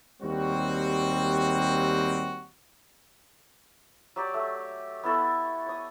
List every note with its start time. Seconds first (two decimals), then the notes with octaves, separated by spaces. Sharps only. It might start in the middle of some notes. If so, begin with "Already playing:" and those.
0.21 D#2 G3 C4 F#4
4.16 F#3 G4 D5
4.34 A3
5.03 B3 E4 A4 C#6
5.66 C#5 D#6